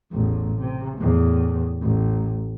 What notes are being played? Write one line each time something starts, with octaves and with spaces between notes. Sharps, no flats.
A1 E2
C3
E2 A2
A1